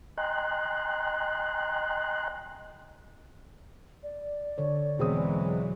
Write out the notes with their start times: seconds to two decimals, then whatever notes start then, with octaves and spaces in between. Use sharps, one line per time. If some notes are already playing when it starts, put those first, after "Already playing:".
0.18 D#5 G5 G#5 A#5 C6 F#6
4.03 D5
4.58 D3 A4 C#5
4.99 E2 B2 E3 F#3 G#3 C4 G#4 D#6